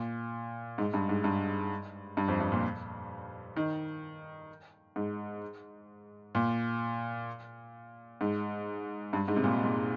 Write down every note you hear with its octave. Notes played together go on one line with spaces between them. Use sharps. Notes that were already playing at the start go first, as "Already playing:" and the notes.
Already playing: A#2
G#2
G2
G#2
G2
G2
F2
G2
A#2
D#3
G#2
A#2
G#2
G2
G#2
C3
A#2
A#2